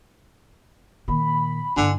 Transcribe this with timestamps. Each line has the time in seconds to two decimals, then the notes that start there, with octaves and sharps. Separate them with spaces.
1.08 A#2 D#3 B5
1.77 G2 D3 E4 G#5